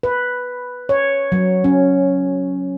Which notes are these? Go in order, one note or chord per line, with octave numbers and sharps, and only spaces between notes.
B4
C#5
F#3
C#4